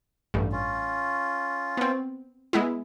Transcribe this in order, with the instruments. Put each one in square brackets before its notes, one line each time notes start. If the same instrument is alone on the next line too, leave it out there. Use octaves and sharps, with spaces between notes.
[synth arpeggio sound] A1 G2
[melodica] C#4 F4
[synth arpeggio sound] B3 C4
G#3 B3 E4